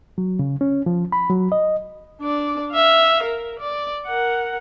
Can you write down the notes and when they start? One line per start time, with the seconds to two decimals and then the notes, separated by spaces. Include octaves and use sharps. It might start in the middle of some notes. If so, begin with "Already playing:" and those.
0.18 F#3
0.39 C#3
0.61 C#4
0.86 F3
1.12 B5
1.30 F#3
1.52 D#5
2.21 D4 D5
2.72 E5 F5
3.23 A#4
3.59 D5
4.07 A#4 F#5